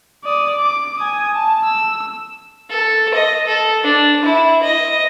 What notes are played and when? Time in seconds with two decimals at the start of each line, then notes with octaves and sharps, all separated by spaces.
0.24 D5 D#6
0.59 D6
0.98 G#5 D#6
1.35 A5
1.65 E6
2.70 A4
3.14 D#5
3.47 A4
3.83 D4
4.24 E4
4.62 D#5